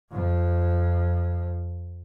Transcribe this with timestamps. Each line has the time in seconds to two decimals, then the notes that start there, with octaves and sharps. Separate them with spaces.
0.11 F2 F3